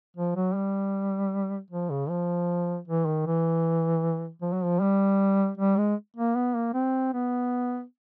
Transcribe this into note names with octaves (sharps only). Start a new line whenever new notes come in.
F3
F#3
G3
F3
C#3
F3
E3
D#3
E3
F3
F#3
F3
G3
G3
G#3
A#3
B3
A#3
C4
B3